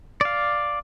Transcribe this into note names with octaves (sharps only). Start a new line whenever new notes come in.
D5 F5